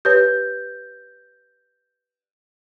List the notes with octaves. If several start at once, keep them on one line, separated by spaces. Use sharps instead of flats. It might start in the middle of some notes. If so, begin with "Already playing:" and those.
G4 B4 C#5 G6